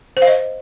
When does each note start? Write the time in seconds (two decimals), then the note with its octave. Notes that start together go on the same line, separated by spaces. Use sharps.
0.17 C5
0.22 F5
0.27 D#5